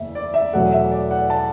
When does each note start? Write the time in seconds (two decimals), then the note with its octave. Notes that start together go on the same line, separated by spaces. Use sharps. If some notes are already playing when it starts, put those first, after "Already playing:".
Already playing: F#1 E2 E5
0.15 D5
0.34 E5
0.53 E2 B2 F#3 A3 F#5
0.72 E5
0.91 D5
1.11 F#5
1.30 A5